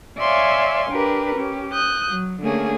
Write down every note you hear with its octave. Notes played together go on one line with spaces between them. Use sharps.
C#5 D5 E5 F5 G#5 C6
D4 G4 A#4 B4
C#4 G4
D#6 F#6 G6
F#3
D3 A3 A#3 C#4 G#4